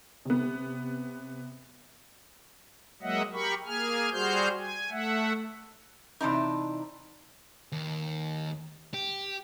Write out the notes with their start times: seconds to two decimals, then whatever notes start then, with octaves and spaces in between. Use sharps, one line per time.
0.25 C3 B3
3.02 F#3 G#3 A#3 D#5 E5 F#5
3.33 G4 A#4 B5 C#6
3.66 A#3 G#4 G#5 F6
4.12 G3 F#4 G#4 C5 F6 G6
4.58 G#5
4.91 A3 E5 F#5
6.21 C3 E3 D4 D#4
7.72 D#2
8.94 G4